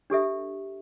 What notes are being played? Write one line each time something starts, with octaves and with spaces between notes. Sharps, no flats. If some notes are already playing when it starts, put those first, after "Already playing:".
D4 G4 A4 E5